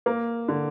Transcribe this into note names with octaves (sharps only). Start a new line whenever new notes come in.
A#3
D3